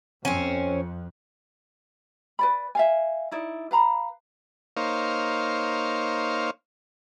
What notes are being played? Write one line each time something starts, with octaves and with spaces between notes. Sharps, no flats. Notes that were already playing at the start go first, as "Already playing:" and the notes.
F2 C4 C#4
B4 D5 B5
E5 F5 G#5
D#4 E4 D5
B4 F5 A#5 B5
A#3 D#4 C5 C#5 F5